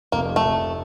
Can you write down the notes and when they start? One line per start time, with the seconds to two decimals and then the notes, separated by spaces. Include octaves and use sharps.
0.12 F1 A#3
0.29 F1
0.36 A3
0.45 F1